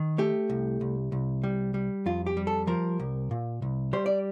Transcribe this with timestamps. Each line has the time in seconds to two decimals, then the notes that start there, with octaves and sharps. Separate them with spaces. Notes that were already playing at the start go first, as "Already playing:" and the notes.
Already playing: D#3
0.18 A3 G4
0.50 C2
0.81 C2
1.12 C2
1.44 G3
1.74 G3
2.06 F2 F4
2.26 G4
2.37 G3
2.47 A4
2.67 F3 A#4
2.99 C2
3.31 A#2
3.62 C2
3.93 G3 C5
4.06 D5